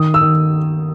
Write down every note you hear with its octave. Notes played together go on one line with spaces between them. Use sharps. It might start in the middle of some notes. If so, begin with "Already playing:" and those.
Already playing: D#3 D#6
E6
D#3